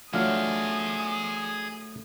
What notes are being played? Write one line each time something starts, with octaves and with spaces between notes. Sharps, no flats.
F#3 A3 D4 F4 G#4 D5 D#6 F6